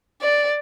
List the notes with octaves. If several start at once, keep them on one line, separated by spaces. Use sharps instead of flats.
D5